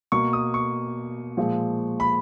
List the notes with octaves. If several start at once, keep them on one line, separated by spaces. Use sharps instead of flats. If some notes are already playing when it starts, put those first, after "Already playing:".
B2 A#3 C#6
D#6
C#6
A#2 F3 G#3
B5